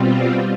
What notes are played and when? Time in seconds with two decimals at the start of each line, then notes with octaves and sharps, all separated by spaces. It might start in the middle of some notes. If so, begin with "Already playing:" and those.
Already playing: B2 G3 C4 F4